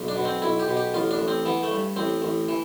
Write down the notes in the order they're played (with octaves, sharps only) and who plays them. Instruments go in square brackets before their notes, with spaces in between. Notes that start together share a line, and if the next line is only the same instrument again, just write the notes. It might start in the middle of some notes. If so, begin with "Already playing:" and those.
Already playing: [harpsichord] B1
D4
B2
C4
B1 E4
G4
B2
G4
A1 F4
D4
A1
C4
E3 B3
A3
G2
A1 C4
A1
E3